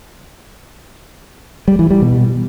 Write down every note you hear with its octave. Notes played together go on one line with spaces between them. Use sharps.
G3
E3
G3
B2